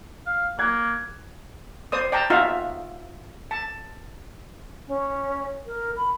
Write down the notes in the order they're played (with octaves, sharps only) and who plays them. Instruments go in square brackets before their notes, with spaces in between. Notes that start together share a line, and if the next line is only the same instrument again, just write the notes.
[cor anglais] F5
[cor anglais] A#3 [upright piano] F#6 G#6
[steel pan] C5 D5 D#6
D5 G5 A5 A#5
D#4 F4 F#4 E5 F5 A#5
A5
[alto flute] C#4
A#4
B5